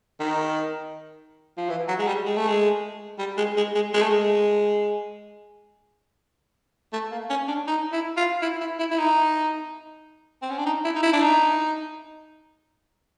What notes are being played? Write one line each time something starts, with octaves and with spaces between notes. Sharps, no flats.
D#3
F3
E3
F#3
G#3
G3
G#3
A3
G#3
G3
G#3
G#3
G#3
G#3
A3
G#3
A3
A#3
C#4
D4
D#4
E4
F4
E4
E4
E4
E4
D#4
C4
C#4
D4
D#4
E4
D#4
E4
D4
D#4